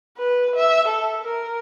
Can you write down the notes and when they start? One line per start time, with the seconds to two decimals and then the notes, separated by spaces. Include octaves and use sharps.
0.18 B4
0.56 E5
0.88 A4
1.24 A#4